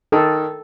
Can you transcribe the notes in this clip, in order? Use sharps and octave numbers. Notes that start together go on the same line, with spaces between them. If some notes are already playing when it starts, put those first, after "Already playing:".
D#3 A4